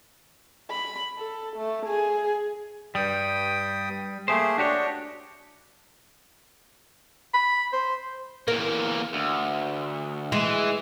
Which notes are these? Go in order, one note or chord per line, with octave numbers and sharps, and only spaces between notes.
B5
A4
A3
G#4
G2 G3 G5 D#6
A3 A#3 G4 G#4 C5
D4 F#4 G4 C#5
B5
C5
E2 A#3 A#4
D2
E3 G#3